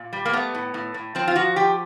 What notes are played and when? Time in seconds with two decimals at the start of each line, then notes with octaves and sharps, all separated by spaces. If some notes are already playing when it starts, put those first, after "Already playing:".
Already playing: A#2
0.13 G3
0.25 A#3
0.33 A3 B3
0.55 A2
0.74 A2
0.94 A2
1.15 F3 C4
1.27 F4
1.36 F3 F#4
1.56 F3 G4